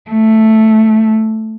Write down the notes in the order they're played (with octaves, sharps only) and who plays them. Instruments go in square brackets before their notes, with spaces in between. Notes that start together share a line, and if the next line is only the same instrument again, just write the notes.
[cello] A3